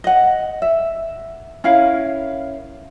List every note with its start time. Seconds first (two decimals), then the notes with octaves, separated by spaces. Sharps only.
0.04 D#5 F#5
0.62 E5
1.64 C#4 E4 A#4 F5